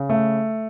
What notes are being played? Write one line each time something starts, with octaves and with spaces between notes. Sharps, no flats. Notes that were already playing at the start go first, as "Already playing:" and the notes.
Already playing: C#3
A3